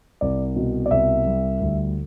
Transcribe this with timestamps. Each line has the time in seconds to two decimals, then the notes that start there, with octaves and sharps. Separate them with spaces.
0.21 C2 D5
0.56 B2
0.86 D5
0.91 C2 E5
1.26 G3
1.60 D2